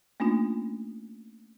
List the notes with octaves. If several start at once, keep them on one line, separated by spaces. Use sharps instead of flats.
A3 A#3 C#4 D4 F4